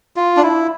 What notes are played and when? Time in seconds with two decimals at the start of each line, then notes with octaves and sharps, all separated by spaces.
0.16 F4
0.37 D4
0.43 E4